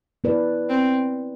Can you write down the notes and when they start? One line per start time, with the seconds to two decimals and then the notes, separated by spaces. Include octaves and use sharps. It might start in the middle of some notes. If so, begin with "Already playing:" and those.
0.24 B3 E4 B4 D5
0.70 C4